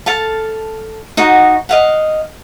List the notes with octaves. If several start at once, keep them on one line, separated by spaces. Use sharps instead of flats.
A4 F5 A5
D#4 F#4 D#5 F#5
D#5 F5 F#5